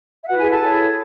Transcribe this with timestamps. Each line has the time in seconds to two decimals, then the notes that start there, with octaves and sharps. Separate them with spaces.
0.22 E5
0.28 E4 F#4 B4 F#5
0.39 G#4 G#5
0.50 A4 A5
0.61 E4 G#4 C#5